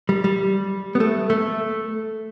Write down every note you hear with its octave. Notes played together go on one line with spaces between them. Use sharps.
G3
G3
B3
A3
A3